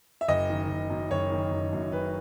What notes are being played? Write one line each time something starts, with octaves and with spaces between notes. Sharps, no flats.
E5
F#1 D#5
D#3
F#1
F#2
F#1 C#5
D#3
F#1
F#2
F#1 B4